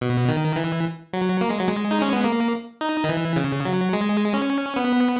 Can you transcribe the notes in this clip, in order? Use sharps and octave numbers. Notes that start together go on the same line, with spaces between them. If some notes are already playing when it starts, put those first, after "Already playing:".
B2
D#3
E3
F#3
A#3
G#3
F#3
G#3
D#4
C#4
B3
A#3
D#4
D#3
E3
C#3
F#3
G#3
C#4
B3